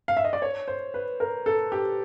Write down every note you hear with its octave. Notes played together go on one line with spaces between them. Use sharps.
F5
E5
D#5
D5
C#5
C5
B4
A#4
A4
G4